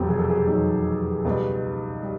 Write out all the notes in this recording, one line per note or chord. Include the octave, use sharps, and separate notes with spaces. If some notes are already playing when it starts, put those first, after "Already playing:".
Already playing: F1 E2 B2 F#3 G4
G#4
A4
G#4
F1 E2 B2 F#3 D#4
C#2 B2 G3
G3